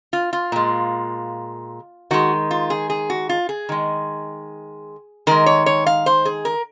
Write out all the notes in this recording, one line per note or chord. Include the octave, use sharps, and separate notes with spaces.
F4
F4
A#2 G#3
D#3 G#3 F#4
F4
G#4
G#4
F#4
F4
G#4
D#3 G#3
D#3 G#3 A#4
C#5
C#5
F5
C5
G#4
A#4